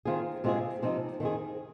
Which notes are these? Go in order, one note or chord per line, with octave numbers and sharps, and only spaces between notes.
D#3 C4 F4 G#4
C3 G#3 C4 F4 G#4
C3 F3 C4 D#4
D#3 C4 G#4